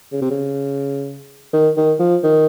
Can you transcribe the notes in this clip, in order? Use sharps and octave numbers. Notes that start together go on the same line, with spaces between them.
C#3
C3
C#3
D#3
D#3
F3
D#3